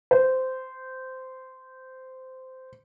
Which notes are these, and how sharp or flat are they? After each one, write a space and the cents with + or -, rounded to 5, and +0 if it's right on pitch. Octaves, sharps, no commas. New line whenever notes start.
C5 -15